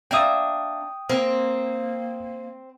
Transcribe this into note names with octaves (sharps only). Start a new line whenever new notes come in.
A#3 D4 E5 G5 D#6
A#3 C4 A#4